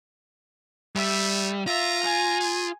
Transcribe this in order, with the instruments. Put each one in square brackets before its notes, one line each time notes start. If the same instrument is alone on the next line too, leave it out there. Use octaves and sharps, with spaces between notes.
[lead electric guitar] G3 [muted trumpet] A3 [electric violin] E5
[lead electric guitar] F4 [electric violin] E5 [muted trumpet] A#5
[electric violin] G#5
[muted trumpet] G#4